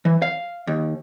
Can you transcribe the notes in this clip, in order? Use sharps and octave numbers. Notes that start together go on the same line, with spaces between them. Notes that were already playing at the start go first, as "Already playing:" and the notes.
E3
F5
D#2